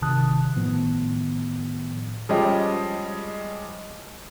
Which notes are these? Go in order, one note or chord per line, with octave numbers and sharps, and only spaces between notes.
G#1 C3 D#3 A5 D#6 F#6
A2 D#3 F3 B3
F3 G3 G#3 C#4 G4 D#5